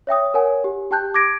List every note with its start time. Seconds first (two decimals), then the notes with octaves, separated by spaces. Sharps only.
0.07 C#5 E5 G5 D#6
0.34 A#4 C#5 F#5 G#5
0.64 G4
0.91 G4 G5 A5 F#6 G6
1.14 D6 G#6 A#6 D7